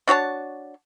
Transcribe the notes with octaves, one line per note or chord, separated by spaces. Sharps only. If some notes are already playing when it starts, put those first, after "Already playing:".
D4 F#4 C#5 A5